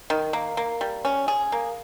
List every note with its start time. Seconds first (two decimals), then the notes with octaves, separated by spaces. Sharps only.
0.10 D#3
0.33 A#3
0.57 A#3
0.81 G3
1.05 C#4
1.28 G#4
1.52 A#3